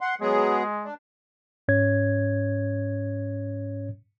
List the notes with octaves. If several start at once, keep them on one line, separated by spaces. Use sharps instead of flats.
F#5 C6
F#3 G#3 B3 G#4
D4
G#2 C#4 C#5 G#6